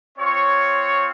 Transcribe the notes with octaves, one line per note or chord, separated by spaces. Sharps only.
C4 F4 C#5